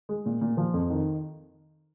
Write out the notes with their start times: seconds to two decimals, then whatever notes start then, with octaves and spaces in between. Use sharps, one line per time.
0.09 G#3
0.26 A#2
0.41 A#2
0.57 F3
0.74 F2
0.90 D#3